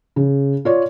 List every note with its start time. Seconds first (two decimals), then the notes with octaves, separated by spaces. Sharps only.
0.16 C#3
0.65 F4 C#5 D5